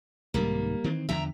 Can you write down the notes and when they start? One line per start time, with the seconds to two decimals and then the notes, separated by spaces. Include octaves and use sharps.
0.34 C2 G#2 D#3 G3 A#3
0.84 D#3 E3 C4
1.09 E2 D3 F3 E5 G5 A#5